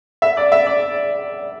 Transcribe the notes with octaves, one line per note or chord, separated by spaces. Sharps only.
E5
D5
E5
D5